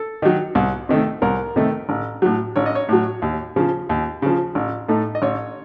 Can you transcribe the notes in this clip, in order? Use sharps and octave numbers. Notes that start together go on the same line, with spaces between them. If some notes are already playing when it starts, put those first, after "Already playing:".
Already playing: A4
D#3 F#3
C2
C3 D#3 A3
C2 A#4
C3 D#3 A3
A1
A2 F#3
A1 C#5
D#5
C#5
A2 F#3
D#2
C#3 F3
D#2
C#3 F3
A1
A2 A3 D#4
D#5
A1 C#5